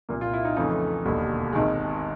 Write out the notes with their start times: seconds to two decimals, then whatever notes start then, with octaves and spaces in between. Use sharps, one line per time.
0.09 C2 A#2 G3 A#3
0.21 F4
0.33 E4
0.45 D#4
0.56 F2 C#3 E3 A3 D#4
1.05 E1 D#2 D3 G3
1.53 G#1 G#2 D#3 G#3